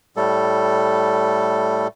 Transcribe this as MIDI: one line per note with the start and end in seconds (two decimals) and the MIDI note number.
0.16 1.88 45
0.16 1.88 55
0.16 1.88 57
0.16 1.88 69